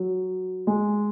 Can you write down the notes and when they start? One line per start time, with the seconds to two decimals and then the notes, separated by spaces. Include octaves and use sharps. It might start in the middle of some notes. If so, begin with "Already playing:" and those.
Already playing: F#3
0.67 G#3